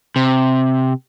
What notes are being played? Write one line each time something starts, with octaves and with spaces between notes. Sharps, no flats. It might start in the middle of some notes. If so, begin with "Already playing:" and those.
C3